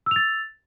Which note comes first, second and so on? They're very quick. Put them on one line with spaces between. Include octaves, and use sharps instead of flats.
E6 F7 A6